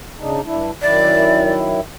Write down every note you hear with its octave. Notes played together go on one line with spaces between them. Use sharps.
C#3 D4 D#4
G2 D4 E4
F#2 D#3 E4 D5